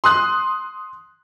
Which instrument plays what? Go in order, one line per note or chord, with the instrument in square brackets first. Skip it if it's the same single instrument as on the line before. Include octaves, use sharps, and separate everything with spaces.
[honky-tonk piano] C6 D#6 F#6